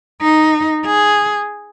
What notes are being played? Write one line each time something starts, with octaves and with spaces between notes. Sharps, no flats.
D#4
G#4